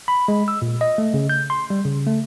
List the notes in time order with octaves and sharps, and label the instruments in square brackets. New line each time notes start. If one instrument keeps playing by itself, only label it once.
[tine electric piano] B5
G#3
E6
A#2
D#5
A3
C#3
G6
C6
G3
C#3
A3